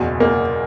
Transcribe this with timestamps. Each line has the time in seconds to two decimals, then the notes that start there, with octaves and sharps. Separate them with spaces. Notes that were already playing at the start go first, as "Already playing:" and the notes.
Already playing: F#1 E2 B2
0.20 A#3